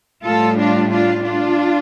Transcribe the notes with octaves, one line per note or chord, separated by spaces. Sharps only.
A2 G3 F4 A4
D4 F4
D4 F4
D4 F4